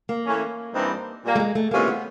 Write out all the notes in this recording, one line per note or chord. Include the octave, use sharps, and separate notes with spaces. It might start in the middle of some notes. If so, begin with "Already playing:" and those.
A#3
E3 A3 C#4
G2 E3 G3 C4 D#4
A#2 G3 A#3
A3
G#3
A3
C3 E3 G#3 A#3 C#4 F4
B3